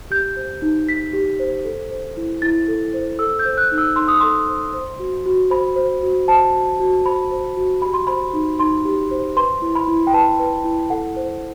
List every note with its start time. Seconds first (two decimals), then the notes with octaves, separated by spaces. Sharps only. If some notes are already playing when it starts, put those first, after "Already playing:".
0.11 G4 G6
0.36 C5
0.62 D#4
0.88 D#4 B6
1.13 G4
1.39 C5
1.65 A4
1.91 C5
2.17 E4
2.42 E4 A6
2.68 A4
2.94 C5
3.19 A4 E6
3.39 G6
3.45 C5
3.57 F#6
3.72 D#4
3.78 E6
3.96 D#4 C6
4.08 D#6
4.20 A4 C6
4.49 C5
4.73 C5
4.99 F#4
5.26 F#4
5.51 C5 B5
5.76 C5
6.03 F#4
6.28 C5 A5
6.54 F#4
6.80 F#4
7.05 C5 B5
7.31 C5
7.57 F#4
7.82 G4 B5
7.94 C6
8.07 C5 B5
8.33 D#4
8.59 D#4 C6
8.85 G4
9.11 C5
9.36 B4 C6
9.62 E4
9.75 B5
9.88 E4
10.07 G5
10.13 B4 A5
10.39 B4
10.64 E4
10.90 A4 F#5
11.16 C5